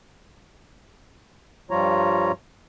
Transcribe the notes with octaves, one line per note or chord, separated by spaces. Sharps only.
G2 F3 G3 F4 C#5 A#5